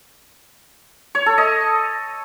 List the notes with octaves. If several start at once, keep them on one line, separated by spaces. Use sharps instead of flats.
C#5
A4
D#5